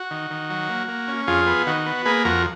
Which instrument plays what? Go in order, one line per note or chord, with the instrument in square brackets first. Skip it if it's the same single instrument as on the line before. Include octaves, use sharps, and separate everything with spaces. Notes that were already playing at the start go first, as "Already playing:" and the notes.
Already playing: [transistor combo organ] F#4
D#3
D#3
F#3
A#3
A#3
C#4
F2 F4 G#4
B3
D#3 F#4
B3
A#3 G#4 B4
F2 F#4 A#4